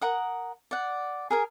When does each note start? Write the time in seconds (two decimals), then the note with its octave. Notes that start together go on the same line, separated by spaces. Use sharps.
0.01 A#4 F#5 D#6
0.71 D5 F#5
1.30 G#4 A#4 G#5